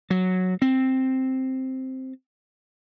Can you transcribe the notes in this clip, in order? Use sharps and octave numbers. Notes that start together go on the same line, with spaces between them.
F#3
C4